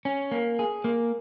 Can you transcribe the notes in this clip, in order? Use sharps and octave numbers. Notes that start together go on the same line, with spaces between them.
C#4
A#3
G#4
A#3